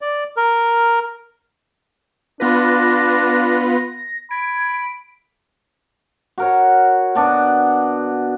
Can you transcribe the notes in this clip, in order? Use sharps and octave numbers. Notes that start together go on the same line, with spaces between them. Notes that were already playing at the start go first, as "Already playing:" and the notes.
D5
A#4
B3 D4 F4 B4 A#6
B5 G#6 D7
F#4 A#4 C#5
B2 D4 F#4